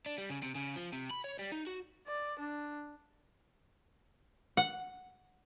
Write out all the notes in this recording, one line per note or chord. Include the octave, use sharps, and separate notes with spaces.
D4
G3
C#3
C3
C#3
F3
C3
B5
C#5
G3
D#4
F#4
D5
D4
F#5